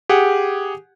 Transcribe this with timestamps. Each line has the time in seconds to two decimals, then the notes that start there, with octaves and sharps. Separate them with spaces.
0.09 G4 G#4 F#5